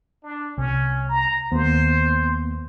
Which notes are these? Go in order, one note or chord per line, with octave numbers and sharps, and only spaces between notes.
D4
C2 C#4
A#5
D#2 A#3 B3 C5